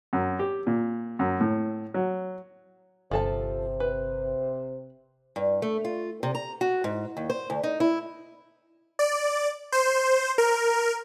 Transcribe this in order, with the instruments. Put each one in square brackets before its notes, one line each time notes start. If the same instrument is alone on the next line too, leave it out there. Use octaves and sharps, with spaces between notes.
[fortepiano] F#2
G4
A#2
F#2
A2
F#3
[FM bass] G1 [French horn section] C3 C5 [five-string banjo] F3 A4 A5
[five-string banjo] B4
[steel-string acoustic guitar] G2
A3
F4
C3
A#5
F#4
G#2
D#2
C5
D2
D#4
E4
[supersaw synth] D5
C5
A#4